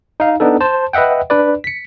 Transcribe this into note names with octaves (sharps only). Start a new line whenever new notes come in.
D#4 F5
B3 D4 D#4 A4
C5 A5
B4 D#5 E5 F#5 G5
D4 B4 D5
B6 C#7